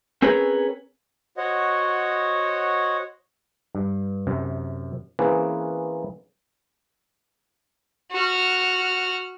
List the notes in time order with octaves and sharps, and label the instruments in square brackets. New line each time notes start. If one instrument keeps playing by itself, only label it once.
[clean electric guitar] C4 C#4 G#4 A#4 B4 C#5
[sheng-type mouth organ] F#4 C5 C#5 D#5 F#5
[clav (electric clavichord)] G2
F#2 C3
E3 A#3 C4 C#4 G#4 B4
[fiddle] F#4 F6